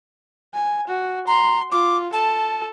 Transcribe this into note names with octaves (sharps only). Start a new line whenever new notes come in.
G#5
F#4
A#5 C6
F4 D6
A4 A5